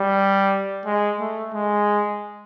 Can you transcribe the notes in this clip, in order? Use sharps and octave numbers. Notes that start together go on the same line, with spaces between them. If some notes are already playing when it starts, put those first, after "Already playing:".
Already playing: G3
G#3
A3
G#3